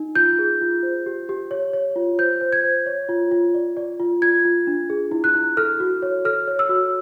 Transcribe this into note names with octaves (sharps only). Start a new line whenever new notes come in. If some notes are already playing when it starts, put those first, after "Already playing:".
Already playing: D#4
F4 G6
G#4
F4
C5
G4
G4
C#5
C#5
F4
C5 G6
C5
G#6
C5
C#5
F4
F4
D5
D5
F4
F4 G#6
F4
D4
G#4
E4
F#6
E4
A4 F6
F#4
C#5
A4 F6
C#5
E6
F#4